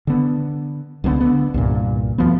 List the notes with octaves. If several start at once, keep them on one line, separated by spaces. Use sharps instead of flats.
D3 B3
C#2 D3 A3 B3
D3 B3
C2 G2 A#2
D2 F3 B3